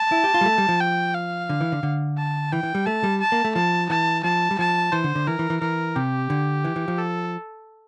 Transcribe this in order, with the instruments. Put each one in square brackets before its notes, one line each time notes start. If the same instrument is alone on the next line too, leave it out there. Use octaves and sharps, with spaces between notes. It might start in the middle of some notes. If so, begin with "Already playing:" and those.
Already playing: [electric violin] A5
[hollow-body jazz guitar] E4
G4
F4
G3
A3
G3
F3
[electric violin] G5
F5
[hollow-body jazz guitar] D3
E3
D3
D3
[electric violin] A5
[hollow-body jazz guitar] E3 [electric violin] G5
[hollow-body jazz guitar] E3
G3
[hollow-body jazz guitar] A3 [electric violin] A5
[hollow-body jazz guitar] G3
[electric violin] A5
[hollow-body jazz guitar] A#3
A3
[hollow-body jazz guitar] F3 [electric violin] A5
[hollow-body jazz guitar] E3 [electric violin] A5
[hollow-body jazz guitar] F3 [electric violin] A5
[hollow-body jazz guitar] G3
[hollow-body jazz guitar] F3 [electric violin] A5
[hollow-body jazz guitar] E3 [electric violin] C5
[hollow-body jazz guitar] D3
D3
[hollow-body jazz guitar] E3 [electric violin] A#4
[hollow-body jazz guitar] E3
E3
[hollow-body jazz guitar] E3 [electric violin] A#4
[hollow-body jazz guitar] C3 [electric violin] G4
[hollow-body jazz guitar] D3
E3
E3
F3
[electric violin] A4